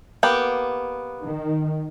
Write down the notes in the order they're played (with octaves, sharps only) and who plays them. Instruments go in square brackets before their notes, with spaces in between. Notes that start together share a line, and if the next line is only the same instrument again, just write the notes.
[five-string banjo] A#3 B3 G4
[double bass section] D#3